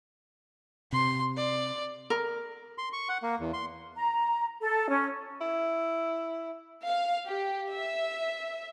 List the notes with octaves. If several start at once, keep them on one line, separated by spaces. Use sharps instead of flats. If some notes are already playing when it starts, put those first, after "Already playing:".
C3 C6
D5
A#4
C6
C#6
F#5
A#3
E2
C6
A#5
A4
C#4
E4
F5
G4
E5